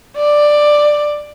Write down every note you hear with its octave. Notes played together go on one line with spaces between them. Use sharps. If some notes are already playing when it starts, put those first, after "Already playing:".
D5